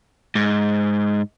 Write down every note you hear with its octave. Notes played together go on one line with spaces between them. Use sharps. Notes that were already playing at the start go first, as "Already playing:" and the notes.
G#2